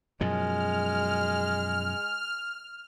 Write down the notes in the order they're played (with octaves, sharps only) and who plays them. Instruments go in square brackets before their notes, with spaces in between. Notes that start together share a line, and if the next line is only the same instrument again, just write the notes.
[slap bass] F#2 B2 F3 [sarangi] G#3 [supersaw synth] F6